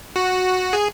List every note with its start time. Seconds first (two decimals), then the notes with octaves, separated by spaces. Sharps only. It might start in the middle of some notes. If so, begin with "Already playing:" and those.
0.16 F#4
0.73 G#4